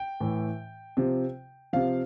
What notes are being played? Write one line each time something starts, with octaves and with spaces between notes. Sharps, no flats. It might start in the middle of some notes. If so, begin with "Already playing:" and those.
Already playing: G5
A2 E3
C3 F3
C3 F3 F5